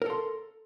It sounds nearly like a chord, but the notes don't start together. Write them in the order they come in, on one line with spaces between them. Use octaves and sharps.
A#4 A4 C6